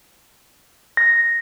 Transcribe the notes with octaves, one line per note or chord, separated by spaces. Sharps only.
A#6